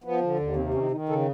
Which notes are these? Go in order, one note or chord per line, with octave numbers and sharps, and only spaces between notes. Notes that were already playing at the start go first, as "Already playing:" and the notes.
F3 B3
D3
D#2
C3 C4
D#3 C#4
D#3 D#4
C#3 A4